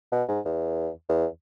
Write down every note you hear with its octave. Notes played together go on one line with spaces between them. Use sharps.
B2
G#2
E2
E2